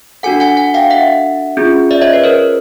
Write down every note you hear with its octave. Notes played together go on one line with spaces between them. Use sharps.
D4 F#4 A4 F#5 G#5
F#5 G#5
F#5 G#5
F5 G5
E5 F#5
C#4 F4 G#4
D5 E5
C#5 D#5
B4 C#5
A#4 C5